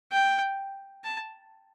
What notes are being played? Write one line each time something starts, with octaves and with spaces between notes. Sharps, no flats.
G5
A5